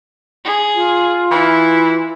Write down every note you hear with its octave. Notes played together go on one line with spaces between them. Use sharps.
G#4
F4
E3 E4